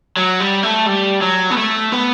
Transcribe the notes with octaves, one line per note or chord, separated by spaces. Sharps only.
F#3
G3
A3
G3
F#3
B3
A3
B3